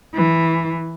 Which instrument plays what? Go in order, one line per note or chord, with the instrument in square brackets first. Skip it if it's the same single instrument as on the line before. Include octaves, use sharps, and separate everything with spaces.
[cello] E3